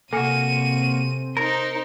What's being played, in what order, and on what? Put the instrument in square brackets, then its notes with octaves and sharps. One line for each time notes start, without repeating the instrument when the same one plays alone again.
[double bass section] C3 C4 [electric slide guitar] A#3 F#4 [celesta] A4 G#5 C#7 [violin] D#7
[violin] D#4 C5 [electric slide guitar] A#4